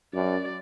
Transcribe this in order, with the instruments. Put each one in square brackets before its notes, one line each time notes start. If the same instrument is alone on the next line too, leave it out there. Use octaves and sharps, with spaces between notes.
[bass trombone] F#2 [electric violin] D5